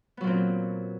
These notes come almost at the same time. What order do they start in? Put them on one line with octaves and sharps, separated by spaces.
B3 F#3 A#2 C4